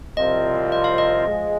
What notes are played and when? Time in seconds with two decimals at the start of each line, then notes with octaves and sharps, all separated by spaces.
0.17 C2 C3 F3 C4 F4 D#5
0.72 D#5
0.84 F5
0.98 D#5
1.27 F3 G#3